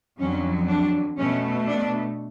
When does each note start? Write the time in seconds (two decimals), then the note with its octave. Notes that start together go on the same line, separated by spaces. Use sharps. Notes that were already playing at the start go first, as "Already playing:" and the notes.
0.19 F2 D3 F#3 C#4
0.69 D4
1.18 B2 A3 C#4
1.68 D4